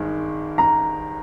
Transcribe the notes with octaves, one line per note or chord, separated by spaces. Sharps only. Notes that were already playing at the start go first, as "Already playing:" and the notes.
Already playing: G#1 G2 D#3 G#3
A#5